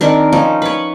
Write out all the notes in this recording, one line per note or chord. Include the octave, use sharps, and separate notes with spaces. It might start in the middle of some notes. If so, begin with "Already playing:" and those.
D#3 C4 D4 A#4
F3 C#4 D#4
B4 C#5